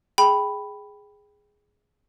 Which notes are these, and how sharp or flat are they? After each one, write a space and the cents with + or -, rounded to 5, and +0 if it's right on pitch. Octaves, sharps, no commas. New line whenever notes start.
G#4 +0 G5 +0 B5 +0